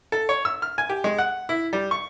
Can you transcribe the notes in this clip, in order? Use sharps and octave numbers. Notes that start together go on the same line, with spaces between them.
A4
C#5
E6
F6
G#5
G4
G#3
F#5
E4
G3
C#6